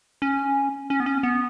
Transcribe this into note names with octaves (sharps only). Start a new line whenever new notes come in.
C#4
C#4
B3
C#4
B3